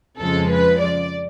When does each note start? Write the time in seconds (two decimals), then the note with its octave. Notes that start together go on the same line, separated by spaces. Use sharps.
0.19 F2 C#3 F3 G#3 A4
0.50 B4
0.82 D5